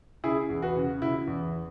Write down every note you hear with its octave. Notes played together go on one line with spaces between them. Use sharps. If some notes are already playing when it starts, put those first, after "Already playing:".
C#3 E4 G#4
E2
F#4 B4
C#3
C#3 E4
E2